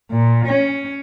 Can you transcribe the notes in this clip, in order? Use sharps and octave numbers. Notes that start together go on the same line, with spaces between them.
A#2
C#4